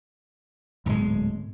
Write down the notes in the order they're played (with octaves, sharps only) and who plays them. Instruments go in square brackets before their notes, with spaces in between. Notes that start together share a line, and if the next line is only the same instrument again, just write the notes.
[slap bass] D1 G#3 [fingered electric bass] G#2 B2